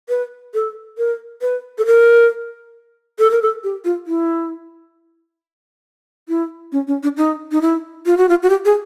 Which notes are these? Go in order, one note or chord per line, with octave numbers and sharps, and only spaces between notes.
B4
A4
A#4
B4
A4
A#4
A4
A#4
A4
G4
F4
E4
E4
C#4
C#4
D4
D#4
D#4
E4
F4
F#4
F4
F#4
G4
G#4